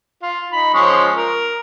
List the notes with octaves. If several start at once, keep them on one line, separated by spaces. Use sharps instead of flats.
F4
D#4 B5
F3 G#3 C#4
A#4